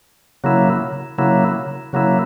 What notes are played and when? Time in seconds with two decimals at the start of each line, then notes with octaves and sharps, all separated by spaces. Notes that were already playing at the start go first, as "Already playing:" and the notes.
0.44 C#3 F#3 A#3 E4
1.18 C#3 F#3 A#3 E4
1.93 C#3 F#3 A#3 E4